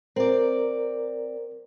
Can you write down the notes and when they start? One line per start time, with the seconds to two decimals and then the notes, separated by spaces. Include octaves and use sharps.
0.16 C4 A#4 D5